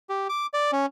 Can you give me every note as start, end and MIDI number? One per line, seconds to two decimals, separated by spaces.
0.09 0.27 67
0.29 0.46 86
0.53 0.71 74
0.72 0.86 61